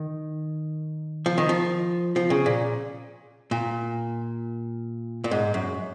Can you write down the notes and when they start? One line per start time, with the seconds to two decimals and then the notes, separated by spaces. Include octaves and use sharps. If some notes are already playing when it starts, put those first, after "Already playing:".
Already playing: D#3
1.26 F3
1.38 D#3
1.49 F3
2.16 F3
2.30 C#3
2.46 A#2
3.51 A#2
5.24 A#2
5.31 G#2
5.54 F#2